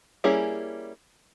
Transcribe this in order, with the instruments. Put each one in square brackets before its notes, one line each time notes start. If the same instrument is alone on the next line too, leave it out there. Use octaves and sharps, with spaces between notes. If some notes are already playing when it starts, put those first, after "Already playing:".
[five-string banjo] G3 A#3 C#4 E4 G#4